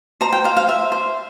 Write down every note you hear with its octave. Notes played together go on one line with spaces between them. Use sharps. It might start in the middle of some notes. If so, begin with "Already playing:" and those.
C5 A#5
G5
C5 F5
F5
C5 E5
C5